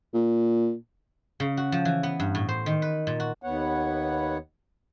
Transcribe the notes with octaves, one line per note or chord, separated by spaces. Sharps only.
A#2
C#3
F#4
F3
E3
B3
G2
A2
C5
D#3
B4
A#2
F#4
D#2 B3 C#5 F#5